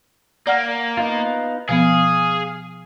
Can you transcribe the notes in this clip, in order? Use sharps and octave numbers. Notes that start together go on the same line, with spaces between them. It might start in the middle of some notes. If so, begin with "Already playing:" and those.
A#3 D5 F#5 F6
B3 D#4 F4
B2 F3 B3 G#4 F5